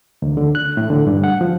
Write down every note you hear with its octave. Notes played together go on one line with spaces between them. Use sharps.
D2
D3
F#6
A2
D3
G2
F#5
F3